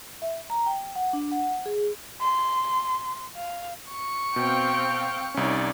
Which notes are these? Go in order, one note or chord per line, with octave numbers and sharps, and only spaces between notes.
E5
A#5
G5
F#5
D4
F#5
G#4
C6
F5
C#6
B2 C4 F5 G5
C2 C#4 D#4 C#5 D5